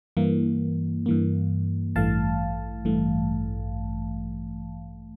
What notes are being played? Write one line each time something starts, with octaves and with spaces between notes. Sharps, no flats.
G2 E3 A#3
G2 E3 A#3
A1 G2 E3 A3 F5 A5
A1 G2 E3 A3